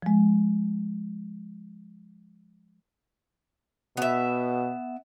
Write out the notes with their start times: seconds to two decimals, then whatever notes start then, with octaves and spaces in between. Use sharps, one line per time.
0.02 F3 G#3
3.97 B2 B3 E5